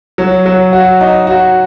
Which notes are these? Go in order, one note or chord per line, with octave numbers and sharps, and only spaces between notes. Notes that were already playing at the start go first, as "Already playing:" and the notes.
F#3
F#3
F#4
D#4
F#4